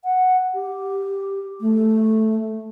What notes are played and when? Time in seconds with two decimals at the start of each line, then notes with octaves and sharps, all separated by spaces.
0.04 F#5
0.55 G4
1.61 A3